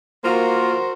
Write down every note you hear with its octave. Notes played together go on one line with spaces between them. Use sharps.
A#3 F4 F#4 A#4 C5